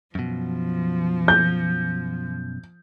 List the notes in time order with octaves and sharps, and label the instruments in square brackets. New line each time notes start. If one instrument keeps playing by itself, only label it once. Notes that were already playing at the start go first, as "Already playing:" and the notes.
[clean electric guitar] F#2 B2 [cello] F3
[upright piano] G6